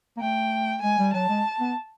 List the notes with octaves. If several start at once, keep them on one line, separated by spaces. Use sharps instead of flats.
A#3
A3 G5
G#3 G#5
G3
F#3 A5
G#3
B3